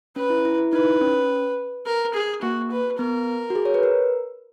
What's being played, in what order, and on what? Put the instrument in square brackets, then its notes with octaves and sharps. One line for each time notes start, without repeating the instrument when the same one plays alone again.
[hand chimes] C#4 [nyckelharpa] B4
[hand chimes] E4
E4
E4
[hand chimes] D#4 [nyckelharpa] B4
[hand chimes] C#4
[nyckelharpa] A#4
G#4
[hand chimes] A#3 [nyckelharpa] F#4
[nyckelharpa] B4
[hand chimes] B3 [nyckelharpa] A#4
[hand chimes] F#4
G#4
C#5
B4
A#4